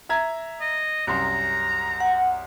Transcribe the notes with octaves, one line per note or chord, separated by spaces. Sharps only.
E5 A#5 G#6
D#5
C2 F#2 A#5 C6
F#5